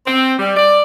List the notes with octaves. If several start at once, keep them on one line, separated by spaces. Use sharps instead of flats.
C4
G3
D5